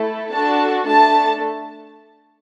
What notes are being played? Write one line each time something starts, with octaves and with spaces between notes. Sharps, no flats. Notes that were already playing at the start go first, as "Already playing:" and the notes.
Already playing: A3 E4 A4
D4 F#4 A4 A5
A3 D4 A4 A5